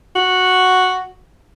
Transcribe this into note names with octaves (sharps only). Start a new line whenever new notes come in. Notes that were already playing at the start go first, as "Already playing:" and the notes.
F#4